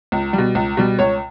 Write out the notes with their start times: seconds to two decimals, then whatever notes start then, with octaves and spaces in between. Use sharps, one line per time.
0.12 C#2
0.33 B2 G3
0.55 C#2
0.77 B2 G3
0.99 C#2 C#5